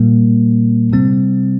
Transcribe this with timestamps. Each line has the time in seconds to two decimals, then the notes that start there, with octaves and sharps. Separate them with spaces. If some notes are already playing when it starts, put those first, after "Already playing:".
Already playing: A#2 G3 A#3
0.92 C3 G3 C4